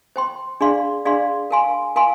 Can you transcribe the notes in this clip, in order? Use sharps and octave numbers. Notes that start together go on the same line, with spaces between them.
C5 G5 C6
D4 G#4 D5 F5 C6
D4 G#4 D5 F5 C6
A#4 F5 G#5 C6
A#4 F5 G#5 C6